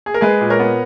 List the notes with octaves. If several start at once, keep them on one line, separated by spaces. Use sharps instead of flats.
G#4
A#4
G#3 G#4 B4
A#2
A#4 C#5
B3